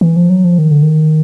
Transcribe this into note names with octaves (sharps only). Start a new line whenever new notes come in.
E3
F3
F#3
F3
D#3
D3
D#3